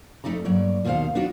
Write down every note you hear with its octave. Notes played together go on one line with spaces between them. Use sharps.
F2 G#2 A3 D#4 D5 A#5
G2 F#3 A#3 C#5 D5
D#2 B2 D#3 E4 C5 F5
B3 D4 D#4 F4 F#4 D5